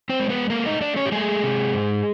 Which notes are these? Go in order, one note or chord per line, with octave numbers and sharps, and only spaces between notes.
C4 C5
G#3
B3 B4
A3 A#3 A#4
D#4 D#5
A3 D4 D5
C#4 C#5
G4
G#3 A3 G#4
C3
G#2